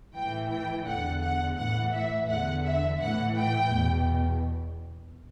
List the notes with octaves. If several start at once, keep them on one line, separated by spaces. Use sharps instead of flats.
A2 E3 G5
G5
E2 D3 F#5
F#5
A2 E3 F#5
E5
E2 D3 F#5
E5
A2 E3 F#5
G5
E2 B2